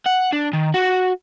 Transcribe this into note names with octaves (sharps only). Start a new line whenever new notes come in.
F#5
D4
D#3
F#4